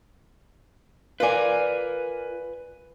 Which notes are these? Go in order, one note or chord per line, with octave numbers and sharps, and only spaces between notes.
F4 A#4 B4 D5 G#5